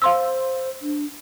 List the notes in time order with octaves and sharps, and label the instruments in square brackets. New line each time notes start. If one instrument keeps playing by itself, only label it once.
[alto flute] C5 [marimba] F5 C6 E6
[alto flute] D4